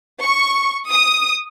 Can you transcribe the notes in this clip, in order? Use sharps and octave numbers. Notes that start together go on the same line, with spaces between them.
C#6
D#6